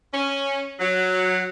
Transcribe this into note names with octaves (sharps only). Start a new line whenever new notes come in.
C#4
F#3